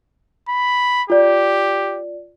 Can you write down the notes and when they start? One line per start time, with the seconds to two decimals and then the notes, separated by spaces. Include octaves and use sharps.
0.49 B5
1.10 F4 G4 D5